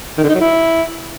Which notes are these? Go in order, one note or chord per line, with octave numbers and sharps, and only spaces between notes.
D#3
D3
D#4
F#3
E4